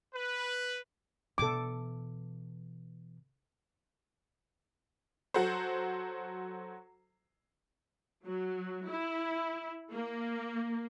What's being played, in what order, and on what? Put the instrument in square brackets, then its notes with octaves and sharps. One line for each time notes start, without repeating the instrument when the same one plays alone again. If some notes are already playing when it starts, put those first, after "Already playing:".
[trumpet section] B4
[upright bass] B2 E3 [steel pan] A4 D6
[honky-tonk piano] F#3 F#4 A4 C5
[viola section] F#3
E4
A#3